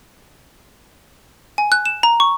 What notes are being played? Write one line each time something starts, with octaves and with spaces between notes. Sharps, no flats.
G#5
F#6
E7
A#5
C#6